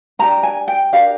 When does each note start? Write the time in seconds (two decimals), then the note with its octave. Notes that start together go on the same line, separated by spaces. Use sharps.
0.19 D4 G4 A#4 A#5
0.43 G#5
0.68 G5
0.93 D4 G4 A#4 F5